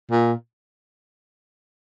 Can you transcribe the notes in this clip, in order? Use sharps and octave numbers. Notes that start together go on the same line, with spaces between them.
A#2